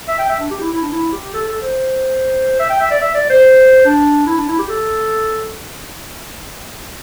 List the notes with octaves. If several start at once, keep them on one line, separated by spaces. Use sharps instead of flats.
E5
G5
E5
D4
G4
E4
E4
D4
E4
G4
A4
A4
C5
E5
G5
E5
D5
E5
D5
C5
D4
E4
D4
E4
G4
A4